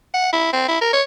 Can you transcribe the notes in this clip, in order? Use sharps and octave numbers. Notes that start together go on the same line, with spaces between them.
F#5
E4
C4
E4
A#4
C#5